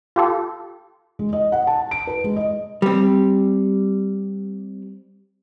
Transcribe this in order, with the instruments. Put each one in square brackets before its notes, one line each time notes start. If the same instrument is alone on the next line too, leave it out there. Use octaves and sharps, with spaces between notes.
[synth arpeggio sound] F4 G4 A4
[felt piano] G#3
D#5
F#5
A5
D7
B4
G#3
D#5
[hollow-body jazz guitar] G3 C4